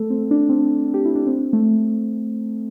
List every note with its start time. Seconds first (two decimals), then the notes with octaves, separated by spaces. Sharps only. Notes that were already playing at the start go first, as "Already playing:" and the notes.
Already playing: A3 A4
0.10 C4
0.31 D4
0.49 C4
0.94 G4
1.05 E4
1.15 D4
1.27 C4
1.53 A3